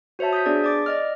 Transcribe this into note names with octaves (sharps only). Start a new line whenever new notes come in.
F#4 C5 C#5 E5 A5
D#6 G6 B6
B3 D4 G#4 D5
D5 D6 A6
D5 D#5 F6